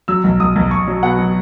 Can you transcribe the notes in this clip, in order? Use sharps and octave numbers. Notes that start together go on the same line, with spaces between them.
F#3 E6
B1
B1 D#6
B1
B1 C#6
F#3
B2 F#5
F#3